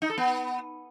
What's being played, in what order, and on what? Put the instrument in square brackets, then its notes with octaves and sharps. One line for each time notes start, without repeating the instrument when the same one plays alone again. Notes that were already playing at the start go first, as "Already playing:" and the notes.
[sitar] D#4
A4
B3